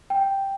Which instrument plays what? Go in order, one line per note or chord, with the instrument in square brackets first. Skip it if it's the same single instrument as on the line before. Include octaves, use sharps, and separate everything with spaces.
[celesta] G5